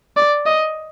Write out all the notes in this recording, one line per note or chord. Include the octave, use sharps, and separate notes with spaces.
D5
D#5